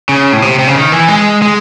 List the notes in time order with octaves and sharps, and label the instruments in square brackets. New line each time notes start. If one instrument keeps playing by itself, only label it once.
[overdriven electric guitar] C#3
A2
C3
C3
C#3
D#3
E3
G#3
G#3